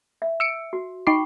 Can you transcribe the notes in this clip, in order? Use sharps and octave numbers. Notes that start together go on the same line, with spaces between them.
E5
E6 C#7 D7
F#4
D#4 G5 B5 C#6 D6 C7